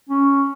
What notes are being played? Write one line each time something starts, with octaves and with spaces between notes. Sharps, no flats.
C#4